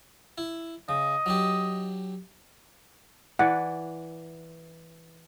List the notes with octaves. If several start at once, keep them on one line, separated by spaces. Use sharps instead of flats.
E4
C#3 D#5
F#3 D4 G4
E3 D5 F#5